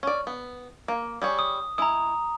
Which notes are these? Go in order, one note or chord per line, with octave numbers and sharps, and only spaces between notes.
C#4 D5
B3
A#3
G3 G#4 C#5
D#6
G#3 E4 A#5 D#6